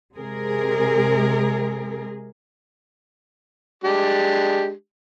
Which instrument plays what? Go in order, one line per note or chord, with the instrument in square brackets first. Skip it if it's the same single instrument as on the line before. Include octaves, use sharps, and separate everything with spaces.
[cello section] C3 G#3 G#4 A#4
[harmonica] G#3 D4 G4